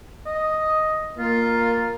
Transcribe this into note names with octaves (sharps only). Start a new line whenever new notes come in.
D#5
A#3 F4